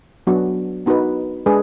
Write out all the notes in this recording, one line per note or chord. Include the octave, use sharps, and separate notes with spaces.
F#3 B3 D4 F#4
B3 D#4 F#4 B4
G#3 D4 G#4 B4